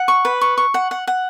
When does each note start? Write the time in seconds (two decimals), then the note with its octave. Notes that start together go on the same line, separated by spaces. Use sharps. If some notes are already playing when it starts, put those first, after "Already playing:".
Already playing: F#5
0.08 C#6
0.25 B4
0.41 C#6
0.58 C#6
0.74 F#5
0.91 F#5
1.07 F#5